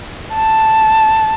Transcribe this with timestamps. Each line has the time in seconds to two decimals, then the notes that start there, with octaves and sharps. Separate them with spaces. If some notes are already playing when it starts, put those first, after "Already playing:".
0.34 A5